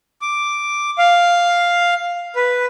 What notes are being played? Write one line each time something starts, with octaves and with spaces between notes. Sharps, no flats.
D6
F5
B4